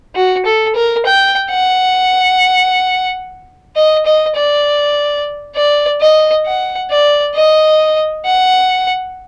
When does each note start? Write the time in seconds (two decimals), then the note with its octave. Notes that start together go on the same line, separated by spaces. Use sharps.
0.15 F#4
0.46 A4
0.75 A#4
1.06 G5
1.51 F#5
3.76 D#5
4.06 D#5
4.36 D5
5.56 D5
6.01 D#5
6.46 F#5
6.91 D5
7.35 D#5
8.26 F#5